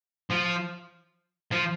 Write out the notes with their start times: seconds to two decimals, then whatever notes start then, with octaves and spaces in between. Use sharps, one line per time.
0.31 F3
1.51 F3